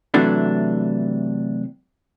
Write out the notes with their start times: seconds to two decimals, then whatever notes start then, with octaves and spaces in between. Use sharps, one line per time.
0.14 C3 E3 F#3 A3 D4